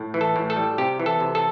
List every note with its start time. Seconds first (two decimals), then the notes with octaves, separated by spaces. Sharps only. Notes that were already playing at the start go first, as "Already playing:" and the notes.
Already playing: A2
0.14 E3
0.21 A4
0.36 A2
0.50 A4
0.56 G3
0.78 C3 G4
1.00 E3
1.06 A4
1.20 C3
1.35 A4